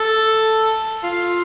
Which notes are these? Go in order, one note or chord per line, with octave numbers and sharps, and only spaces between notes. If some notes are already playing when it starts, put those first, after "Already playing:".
Already playing: A4
F4